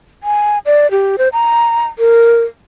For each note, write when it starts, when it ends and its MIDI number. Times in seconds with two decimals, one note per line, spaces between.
0.23 0.59 80
0.66 0.90 74
0.91 1.16 67
1.18 1.29 72
1.33 1.87 82
1.99 2.42 70